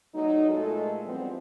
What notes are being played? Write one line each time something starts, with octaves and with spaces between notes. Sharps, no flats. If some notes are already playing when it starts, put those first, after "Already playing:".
E2 F#3 A3 D#4
A#2 G#3 A3 F4 A4
E3 F3 G3 B3 C4